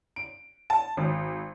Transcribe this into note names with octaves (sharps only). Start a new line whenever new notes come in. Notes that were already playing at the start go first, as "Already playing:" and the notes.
D7
A5
G#1